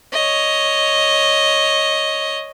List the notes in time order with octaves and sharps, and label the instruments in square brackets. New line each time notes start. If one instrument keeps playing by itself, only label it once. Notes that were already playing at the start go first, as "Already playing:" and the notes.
[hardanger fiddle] C#5 D#5